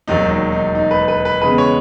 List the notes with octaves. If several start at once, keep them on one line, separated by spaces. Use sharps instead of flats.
E1 D#2 D#3 F#3 D#4
D#4
D#4
D#4
B4
B4
B4
E2 C#3 G#3 B4
C#5